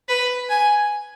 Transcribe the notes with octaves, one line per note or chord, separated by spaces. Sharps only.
B4
G#5